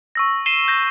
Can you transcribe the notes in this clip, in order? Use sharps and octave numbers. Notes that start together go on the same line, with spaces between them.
C#6 E6 A#6
C7 D#7 E7 G7
G6 A#6